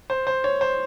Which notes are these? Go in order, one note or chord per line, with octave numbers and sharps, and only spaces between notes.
C5
C5
C#5
C5